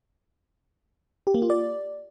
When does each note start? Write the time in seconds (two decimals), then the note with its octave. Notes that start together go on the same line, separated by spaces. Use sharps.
1.27 G4
1.34 A#3
1.42 F4
1.50 D5